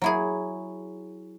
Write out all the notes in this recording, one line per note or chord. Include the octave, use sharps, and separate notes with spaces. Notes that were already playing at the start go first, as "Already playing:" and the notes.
F#3 E4 G#4